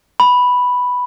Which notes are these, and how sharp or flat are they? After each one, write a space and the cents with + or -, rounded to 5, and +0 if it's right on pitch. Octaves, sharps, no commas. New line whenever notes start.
B5 +0